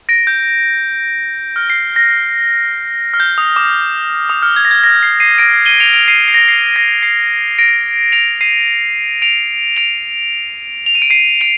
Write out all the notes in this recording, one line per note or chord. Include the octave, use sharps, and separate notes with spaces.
A#6 D7
G6
F6
C7
A#6
F6
G6
D#6
D6
D#6
F6
G#6
A#6
G#6
A#6
C7
C7 D#7
A#6 D7
D#7 G7
D7 F7
D7 F7
C7 D#7
C7
A#6
C7
A#6
C7
A#6 D7
D7 F7
C7 D#7
D7 F7
D7 F7
F7
D#7
D7
C7 D#7
D7 F7